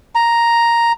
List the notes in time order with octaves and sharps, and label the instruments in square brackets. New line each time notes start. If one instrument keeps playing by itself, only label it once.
[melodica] A#5